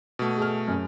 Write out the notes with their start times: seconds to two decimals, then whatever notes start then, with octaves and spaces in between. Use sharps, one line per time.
0.19 B2 A3
0.38 G#4 F6
0.68 F#2